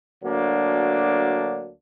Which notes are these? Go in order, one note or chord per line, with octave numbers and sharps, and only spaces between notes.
D2 F#3 A#3 D4